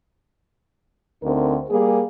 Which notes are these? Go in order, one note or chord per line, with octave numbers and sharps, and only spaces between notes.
D2 C4 D#4 A#4
G3 A#3 G#4